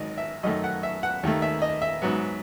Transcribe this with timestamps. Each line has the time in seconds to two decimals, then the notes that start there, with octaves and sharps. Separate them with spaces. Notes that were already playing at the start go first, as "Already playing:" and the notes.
Already playing: G#1 G#2 D#3 F#3 D#5
0.18 E5
0.43 F#2 D#3 A3 D#5
0.64 F#5
0.83 E5
1.03 F#5
1.23 D#2 D#3 A3
1.42 E5
1.62 D#5
1.82 E5
2.02 G#2 F#3 B3